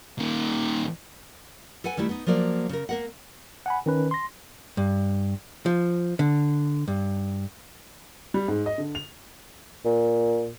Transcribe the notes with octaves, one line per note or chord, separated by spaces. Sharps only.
A#2 D#3
A4 B4 F#5 G#5
D#3 G3 A3 E4
B3 D#4
F3 F#3 A#3 D5
C#3 A#4
A#3 A#4 F#5
F#5 G#5 B5
D#3 C#4 B4
C6 A#6
G2
F3
D3
G2
G3
G#2
D#5
D3
F7
A#2